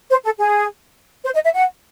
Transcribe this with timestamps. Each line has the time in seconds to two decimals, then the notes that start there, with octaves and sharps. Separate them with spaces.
0.10 C5
0.24 A4
0.39 G#4
1.24 C5
1.34 D#5
1.44 E5
1.54 F#5